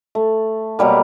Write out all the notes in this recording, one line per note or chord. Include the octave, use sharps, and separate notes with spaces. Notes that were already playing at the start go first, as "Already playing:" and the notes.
A3
B2 F#3 G3 A#3